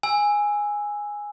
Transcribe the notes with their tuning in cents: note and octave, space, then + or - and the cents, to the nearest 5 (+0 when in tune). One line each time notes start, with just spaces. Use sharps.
G#5 -5 E6 +0